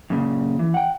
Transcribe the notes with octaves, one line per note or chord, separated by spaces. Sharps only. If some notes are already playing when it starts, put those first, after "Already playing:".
F#2 A#2 C#3
E3
F#5 G5